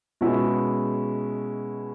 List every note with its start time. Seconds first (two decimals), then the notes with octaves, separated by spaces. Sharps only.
0.21 B2 G#3 C#4 E4 G#4